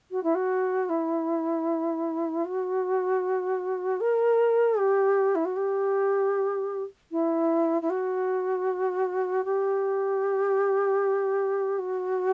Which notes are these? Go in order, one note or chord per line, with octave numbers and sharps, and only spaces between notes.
F#4
E4
F#4
E4
F#4
A#4
G4
E4
F#4
G4
E4
E4
F#4
G4
F#4